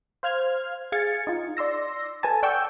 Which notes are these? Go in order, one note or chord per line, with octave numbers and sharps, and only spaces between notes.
C5 F5 F6 G#6
G#4 F5 G#6 A6 C#7
D#4 F4
D5 C6 E6 A#6
A4 B4 G#5 A5
D5 F#5 G5 C#6 E6 G6